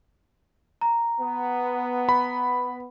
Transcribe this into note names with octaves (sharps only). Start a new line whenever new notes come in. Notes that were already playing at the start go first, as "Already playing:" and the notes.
A#5
B3
B5